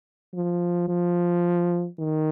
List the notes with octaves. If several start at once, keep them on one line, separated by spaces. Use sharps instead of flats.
F3
F3
D#3